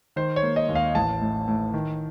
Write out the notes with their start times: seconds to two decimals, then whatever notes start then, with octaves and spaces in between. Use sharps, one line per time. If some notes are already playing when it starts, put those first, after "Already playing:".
0.16 D#3 C5
0.36 C#5
0.43 A#3
0.56 D#5
0.69 D#2
0.75 F5
0.95 A1 A5
1.21 A2
1.48 A2
1.74 D#3